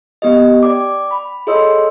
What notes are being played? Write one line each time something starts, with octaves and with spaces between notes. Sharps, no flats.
B3 G4 D#5
D5 G5 D6
B5
G#4 A4 C#5 D#5 C6 E6